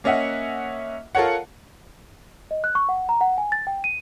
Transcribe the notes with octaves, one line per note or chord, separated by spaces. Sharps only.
A#3 C#4 D#5 E5 F#5
F4 A4 A#4 C#5 F#5
D#5
F#6
C#6
F#5
A#5
F#5
G#5
A6
G5
D#7